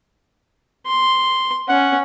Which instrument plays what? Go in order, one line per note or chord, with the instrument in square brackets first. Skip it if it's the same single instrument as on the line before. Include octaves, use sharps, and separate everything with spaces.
[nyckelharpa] C6
[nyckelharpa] C#4 [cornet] F#5